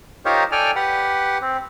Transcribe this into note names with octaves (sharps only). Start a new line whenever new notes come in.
D#4 F4 G4 A#4 C5 C#5
A4 D5 G5 G#5 F6
G4 B4 F#5
C4